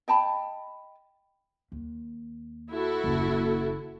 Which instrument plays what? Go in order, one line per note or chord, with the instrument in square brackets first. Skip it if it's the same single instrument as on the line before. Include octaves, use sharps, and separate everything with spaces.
[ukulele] D#5 G5 A5 B5
[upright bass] D#2
[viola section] E4 F#4 A4
[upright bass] F#1 D#2